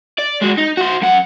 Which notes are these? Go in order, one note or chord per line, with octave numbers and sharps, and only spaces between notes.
D5
G#3 F#4
D#4
F#4 C5
F#2 F#5